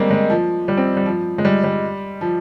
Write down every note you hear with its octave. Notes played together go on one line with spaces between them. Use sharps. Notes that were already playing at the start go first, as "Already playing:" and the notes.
Already playing: G3 G#3 A#3 C4
G#3
F3
G3
C4
G3
F3
G#3
G3
G3
F3